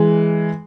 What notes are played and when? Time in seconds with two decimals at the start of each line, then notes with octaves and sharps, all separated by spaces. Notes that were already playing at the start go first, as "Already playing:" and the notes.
Already playing: E3 G#3